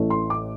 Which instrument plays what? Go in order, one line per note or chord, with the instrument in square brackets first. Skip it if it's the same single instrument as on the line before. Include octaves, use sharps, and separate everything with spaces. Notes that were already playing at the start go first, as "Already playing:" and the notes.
Already playing: [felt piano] A1 A2 E3 A3
C6
D6